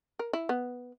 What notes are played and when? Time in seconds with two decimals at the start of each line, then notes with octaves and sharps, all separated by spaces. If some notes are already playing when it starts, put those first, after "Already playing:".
0.19 A#4
0.33 E4
0.49 B3